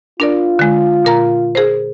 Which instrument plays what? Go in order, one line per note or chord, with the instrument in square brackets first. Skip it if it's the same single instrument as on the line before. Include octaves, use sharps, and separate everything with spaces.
[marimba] D4 A#4 D5 [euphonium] F4
[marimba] D3 G#3
A#2 A#4 A#5
G#4 A#4 C5